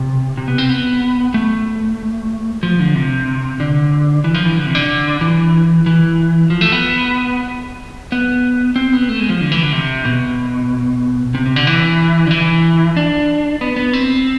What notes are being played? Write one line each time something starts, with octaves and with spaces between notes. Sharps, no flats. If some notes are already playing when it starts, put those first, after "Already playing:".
Already playing: C3
C3
B3
C4
B3
A3
F3
D3
C3
D3
E3
F3
E3
D3
C3
D3
E3
E3
F3
A3
B3
B3
C4
B3
A3
G#3
F3
D3
E3
D3
C3
B2
C3
C3
D3
E3
D3
E3
D4
B3
B3
C4